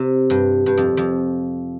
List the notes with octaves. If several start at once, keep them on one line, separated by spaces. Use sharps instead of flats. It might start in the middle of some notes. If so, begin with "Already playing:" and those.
Already playing: C3
G2
G2
F2
F2